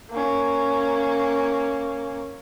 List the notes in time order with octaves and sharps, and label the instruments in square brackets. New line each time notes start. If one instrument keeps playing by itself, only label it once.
[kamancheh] A#3 C#4